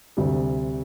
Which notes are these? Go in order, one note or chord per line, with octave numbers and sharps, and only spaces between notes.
D2 C3 G3